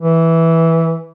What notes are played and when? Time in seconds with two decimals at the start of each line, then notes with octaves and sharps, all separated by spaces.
0.02 E3